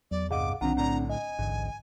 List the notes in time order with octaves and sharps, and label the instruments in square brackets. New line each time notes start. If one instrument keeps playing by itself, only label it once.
[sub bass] E2 [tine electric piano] F#3 [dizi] D5
[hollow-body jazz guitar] C2 G2 D#5 [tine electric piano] G#4 F5 F#5 [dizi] D6
[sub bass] B1 [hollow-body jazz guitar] D#3 F4 [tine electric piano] C4 D4 F#5 [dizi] A#5
[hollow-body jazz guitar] A2 D3 D5 [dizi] A#5
[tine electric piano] D#5 [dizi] G#5
[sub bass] A1 [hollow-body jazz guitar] D2 G#2